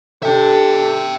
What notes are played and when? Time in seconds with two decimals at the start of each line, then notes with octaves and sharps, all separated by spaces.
0.23 D4 G4 A4 E5 G5